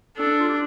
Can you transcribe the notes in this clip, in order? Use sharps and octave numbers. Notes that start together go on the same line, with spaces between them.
D4 A4
F4
G4